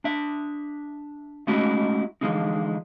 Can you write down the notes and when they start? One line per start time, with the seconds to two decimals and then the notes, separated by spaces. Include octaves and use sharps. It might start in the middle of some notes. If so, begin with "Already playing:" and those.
0.04 D4 E5
1.47 G#3 A3 C#4 D#4 E4 F#4
2.21 D3 E3 F3 G#3 C#4 D#4